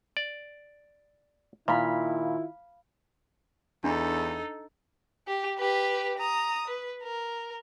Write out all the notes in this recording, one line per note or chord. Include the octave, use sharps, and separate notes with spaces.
D5
A#2 D#3 E4 F4 F5 B5
E2 D4 D#4 A4
G4
G4 B4
A#5 D#6
B4
A#4